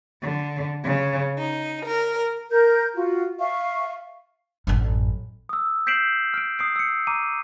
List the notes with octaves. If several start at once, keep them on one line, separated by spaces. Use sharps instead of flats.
D3
C#3
D#4
A#4
A#4 G6
F4 F#4
E5 F5 C#6
A1 F#2
D#6 E6
G6 B6 C7 D7 E7 F#7
F6 D7
D#6 C7 D7
E6 C#7
A#5 D6 D#7